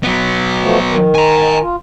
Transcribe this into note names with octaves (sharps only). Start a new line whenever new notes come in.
F#3 B3
B2 F3 A3
D#3
G#5 A#5
F4